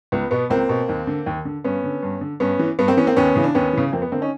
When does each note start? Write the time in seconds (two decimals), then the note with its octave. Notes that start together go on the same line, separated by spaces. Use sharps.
0.12 C#2 B3
0.31 B2 B3
0.50 C#2 A#3 C4
0.69 B2
0.89 D#2
1.07 D3
1.26 D#2
1.45 D3
1.64 G2 B3 C#4
1.84 D3
2.03 G2
2.21 D3
2.40 G2 B3 C#4
2.59 E3
2.79 G2 B3
2.88 A#3 C4
2.97 E3 B3 C#4
3.07 A#3 C4
3.16 D#2 B3 C#4
3.36 C#3 E3
3.44 D4
3.55 D#2 B3 C#4
3.73 C#3 E3
3.92 F2 A#3 C4
4.02 B3
4.12 D3 A#3 C4
4.21 C#4 D#4